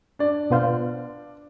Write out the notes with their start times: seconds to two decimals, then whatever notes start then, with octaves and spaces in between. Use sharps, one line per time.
0.19 D4 D5
0.50 B2 B3 F4 C5 F5